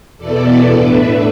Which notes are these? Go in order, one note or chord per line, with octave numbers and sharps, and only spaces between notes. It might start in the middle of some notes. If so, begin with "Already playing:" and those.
E2 B2 B3 E4 A4 D5
A2 A3 D4 B4 E5